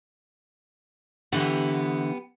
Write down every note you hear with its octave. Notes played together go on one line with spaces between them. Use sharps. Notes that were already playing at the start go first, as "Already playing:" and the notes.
D3 E3 B3 G4 F#5